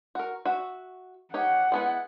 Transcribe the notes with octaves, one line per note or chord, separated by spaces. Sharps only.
F#4 A#4
F#4 E5
D#4 G4 C#5 F#5
G#3 B3 E4